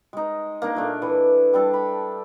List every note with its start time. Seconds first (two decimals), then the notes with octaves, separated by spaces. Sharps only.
0.13 G#3 D#4
0.62 A#3 D4 D#4
0.75 A#2 A3 D4
1.02 E3
1.53 G3 D4 A4
1.74 B5